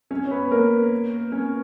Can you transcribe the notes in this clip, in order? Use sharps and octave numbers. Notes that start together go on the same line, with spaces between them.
C#4 C#5
C#5
B3 B4
A#3 A#4
C#4 C#5